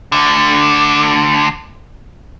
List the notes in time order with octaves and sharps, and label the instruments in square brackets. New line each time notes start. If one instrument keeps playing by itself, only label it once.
[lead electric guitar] D2 D3